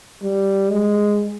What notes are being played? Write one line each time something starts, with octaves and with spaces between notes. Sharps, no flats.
G3
G#3